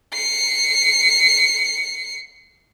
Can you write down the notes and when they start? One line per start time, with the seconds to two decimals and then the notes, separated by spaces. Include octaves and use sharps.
0.13 C7 C#7